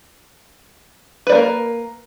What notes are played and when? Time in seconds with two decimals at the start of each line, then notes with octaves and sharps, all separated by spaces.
1.27 B4
1.29 D5
1.32 A#3
1.35 A#4